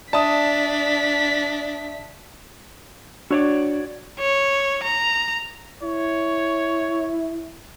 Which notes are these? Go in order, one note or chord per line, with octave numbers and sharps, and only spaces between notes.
D4 D5 E5 A5 D#6 B6
D4 F#4 C#5 D5
C#5
A#5
E4 C#5